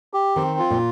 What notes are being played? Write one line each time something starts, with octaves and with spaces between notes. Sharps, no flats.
G4
D#3 C4
F4
A#2